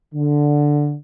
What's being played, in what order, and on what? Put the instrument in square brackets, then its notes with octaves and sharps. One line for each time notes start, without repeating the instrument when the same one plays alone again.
[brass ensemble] D3